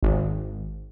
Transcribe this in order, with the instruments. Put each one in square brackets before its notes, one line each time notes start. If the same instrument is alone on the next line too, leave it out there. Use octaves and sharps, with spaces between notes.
[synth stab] G#1